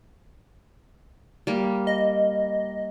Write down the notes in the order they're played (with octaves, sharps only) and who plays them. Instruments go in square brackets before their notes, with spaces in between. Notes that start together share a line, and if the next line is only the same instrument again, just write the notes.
[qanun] G3 A#3
[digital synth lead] D#5